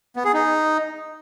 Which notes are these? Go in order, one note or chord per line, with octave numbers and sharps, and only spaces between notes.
B3
G#4
D#4